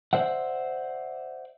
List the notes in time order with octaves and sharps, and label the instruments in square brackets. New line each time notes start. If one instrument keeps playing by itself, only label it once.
[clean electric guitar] C5 D5 E5 F#5